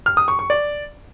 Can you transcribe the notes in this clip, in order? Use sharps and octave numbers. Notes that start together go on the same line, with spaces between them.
F6
D#6
C#6
C#6
D5